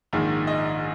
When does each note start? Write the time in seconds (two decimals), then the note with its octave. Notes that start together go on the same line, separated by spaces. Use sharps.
0.13 A#1 G#2 D#3
0.47 D#5